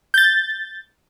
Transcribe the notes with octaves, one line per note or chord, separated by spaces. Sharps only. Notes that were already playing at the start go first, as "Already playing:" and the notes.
G6 A6